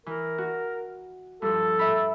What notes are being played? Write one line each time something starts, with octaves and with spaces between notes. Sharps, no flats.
E3 A#4
F#4
G2 F3 A4
E5 B5